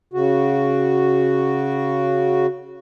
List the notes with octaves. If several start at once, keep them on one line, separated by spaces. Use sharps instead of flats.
C#3 F#4